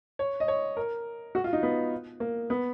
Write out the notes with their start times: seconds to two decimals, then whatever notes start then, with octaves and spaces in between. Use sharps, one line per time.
0.19 C#5
0.40 D#5
0.48 C#5
0.77 A#4
1.35 F#4
1.44 F4
1.53 D#4
1.63 B3
2.20 A#3
2.50 B3